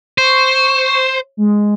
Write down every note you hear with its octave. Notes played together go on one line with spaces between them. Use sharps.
C5 C#6
G#3